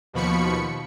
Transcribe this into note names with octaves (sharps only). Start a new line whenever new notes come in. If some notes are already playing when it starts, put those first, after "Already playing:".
D#2 B2 F3 B5 C#6 C#7